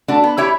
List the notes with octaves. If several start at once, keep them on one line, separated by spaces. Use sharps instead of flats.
A3 D4 F#4
B3
E4 G4 C#5 E5